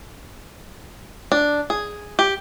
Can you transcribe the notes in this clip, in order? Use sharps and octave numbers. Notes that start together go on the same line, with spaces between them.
D4
G#4
G4